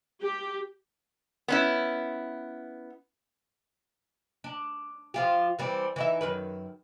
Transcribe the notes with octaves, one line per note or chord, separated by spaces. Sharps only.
G4
B3 C#4 E4
D4
F3 F4 G4
E3 G3 C4
E3 D#4 E5
F#2 D#3 B4